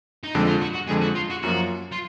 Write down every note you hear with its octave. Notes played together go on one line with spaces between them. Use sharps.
D#4
F2 D3 G#3 D4
F4
F#4
F#4
F2 D3 G#3 G#4
F#4
F4
F#4
F#2 F3 A#3 F4 F#4
F4